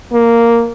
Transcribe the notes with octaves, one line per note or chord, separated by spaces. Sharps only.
A#3